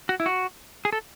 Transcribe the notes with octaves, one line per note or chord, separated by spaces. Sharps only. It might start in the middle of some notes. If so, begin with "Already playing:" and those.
F#4
E4
F#4
G#4
A4